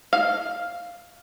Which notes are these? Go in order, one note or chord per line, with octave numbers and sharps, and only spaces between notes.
F5